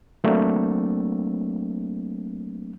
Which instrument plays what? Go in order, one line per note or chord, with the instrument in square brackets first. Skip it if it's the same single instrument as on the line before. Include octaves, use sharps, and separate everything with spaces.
[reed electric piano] F#3 A3 A#3 C4 D4